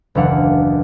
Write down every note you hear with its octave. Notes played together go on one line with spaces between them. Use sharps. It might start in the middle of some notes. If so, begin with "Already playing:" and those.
F#1 D#2 E3 D4 F5 F#5